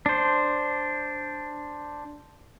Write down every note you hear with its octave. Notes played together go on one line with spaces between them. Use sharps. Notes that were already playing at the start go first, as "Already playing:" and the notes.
D4 C5